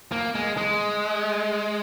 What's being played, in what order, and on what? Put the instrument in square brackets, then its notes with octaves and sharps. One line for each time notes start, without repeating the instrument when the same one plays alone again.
[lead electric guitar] A#3
G#3
G#3